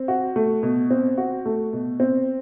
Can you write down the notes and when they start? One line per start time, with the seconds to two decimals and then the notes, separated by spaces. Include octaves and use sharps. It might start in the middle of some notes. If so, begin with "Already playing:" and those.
Already playing: C4
0.08 F#4
0.36 A3
0.63 B2
0.90 C4
1.18 F#4
1.46 A3
1.73 B2
2.00 C4